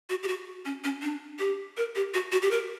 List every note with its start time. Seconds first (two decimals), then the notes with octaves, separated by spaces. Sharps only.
0.10 F#4
0.23 G4
0.28 F#4
0.65 C#4
0.84 C#4
1.02 D4
1.39 G4
1.77 A#4
1.96 G4
2.14 F#4
2.32 F#4
2.42 G4
2.51 A#4